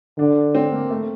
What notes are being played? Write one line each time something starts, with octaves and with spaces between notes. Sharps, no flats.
D3 D4
C4
A#3
A3